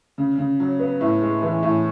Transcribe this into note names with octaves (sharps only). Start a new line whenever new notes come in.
C#3
C#3
F#3
B3
A2
G#3
E3
A2